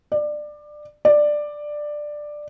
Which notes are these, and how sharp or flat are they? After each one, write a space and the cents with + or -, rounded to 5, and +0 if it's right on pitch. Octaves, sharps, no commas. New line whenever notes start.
D5 +20
D5 +10